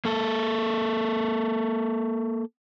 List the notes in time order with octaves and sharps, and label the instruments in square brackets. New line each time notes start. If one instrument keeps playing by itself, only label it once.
[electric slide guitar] A#3 A4